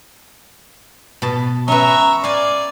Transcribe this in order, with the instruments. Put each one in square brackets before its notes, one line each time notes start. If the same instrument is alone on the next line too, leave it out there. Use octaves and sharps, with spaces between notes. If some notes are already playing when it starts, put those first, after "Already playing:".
[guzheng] B2 A5
[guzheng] C#4 B4 [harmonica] E5 A#5 C#6
[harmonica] D5 [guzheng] F5 G#5